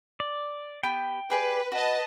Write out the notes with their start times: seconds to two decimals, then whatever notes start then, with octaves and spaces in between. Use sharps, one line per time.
0.20 D5
0.83 B3 G4 G5
1.30 G4 G#4 B4 D5
1.72 F#4 B4 D#5 A5